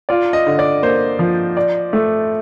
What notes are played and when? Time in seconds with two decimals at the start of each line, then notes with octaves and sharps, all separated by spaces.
0.09 F4 D5
0.33 D#5
0.47 D3
0.59 D5
0.82 A#3 C5
1.19 F3
1.57 D5
1.93 A3